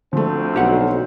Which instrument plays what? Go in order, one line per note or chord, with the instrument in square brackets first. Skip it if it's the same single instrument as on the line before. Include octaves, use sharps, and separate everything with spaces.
[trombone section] D2 C4 [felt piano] F3 A3
[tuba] B1 [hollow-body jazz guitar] G4 F#5